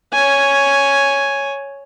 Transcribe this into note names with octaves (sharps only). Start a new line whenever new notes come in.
C#5 G#5